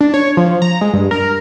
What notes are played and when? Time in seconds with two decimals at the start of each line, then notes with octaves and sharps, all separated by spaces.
0.01 D4
0.14 C#5
0.37 F3
0.62 A#5
0.81 G#3
0.93 G2
1.11 A#4